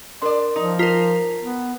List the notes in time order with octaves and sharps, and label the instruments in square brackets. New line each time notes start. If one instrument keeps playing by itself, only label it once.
[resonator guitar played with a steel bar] D4 D5 [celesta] A#4 C6
[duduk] F3 [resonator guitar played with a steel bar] D#4
[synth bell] F4 A#4 [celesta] A#5 B6 F7
[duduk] B3